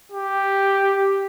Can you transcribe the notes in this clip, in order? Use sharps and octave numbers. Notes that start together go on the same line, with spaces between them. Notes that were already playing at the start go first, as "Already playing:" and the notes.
G4